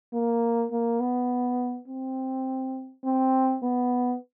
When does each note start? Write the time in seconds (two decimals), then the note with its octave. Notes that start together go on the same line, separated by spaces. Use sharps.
0.13 A#3
0.71 A#3
1.00 B3
1.88 C4
3.04 C4
3.63 B3